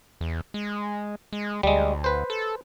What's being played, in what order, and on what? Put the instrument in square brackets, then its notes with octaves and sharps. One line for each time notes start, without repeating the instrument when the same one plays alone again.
[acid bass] E2
G#3
G#3
[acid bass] D2 [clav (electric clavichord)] G3 G#3
[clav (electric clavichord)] B4 C5
[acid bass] A4